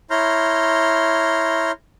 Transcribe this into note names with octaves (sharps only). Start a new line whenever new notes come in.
E4 C#5 A#5 C6 F6 G6